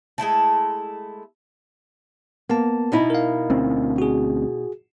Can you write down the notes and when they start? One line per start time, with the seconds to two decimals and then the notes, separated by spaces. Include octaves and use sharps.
0.18 G#3 A3 E4 A4
2.50 A#3 B3 A5
2.92 B2 D#4 E4
3.10 A#4 F5
3.50 D2 C4 C#4
3.98 F#4 G#4